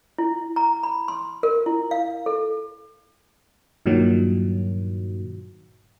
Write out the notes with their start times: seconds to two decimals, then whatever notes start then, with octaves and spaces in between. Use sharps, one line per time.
0.18 E4
0.56 A#5
0.83 B5
1.08 C6
1.43 A#4
1.66 E4
1.91 F5
2.26 A4
3.86 G2 A#2 D#3 F#3